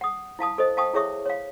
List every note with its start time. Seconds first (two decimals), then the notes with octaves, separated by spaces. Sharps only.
0.01 F#5 D#6
0.39 E4 F5 A5 D#6
0.58 A4 C5 D#5
0.77 F5 G5 A5 C#6 D#6
0.94 E4 G#4 C#5 E5 C#6 D#6
1.25 C#5 F5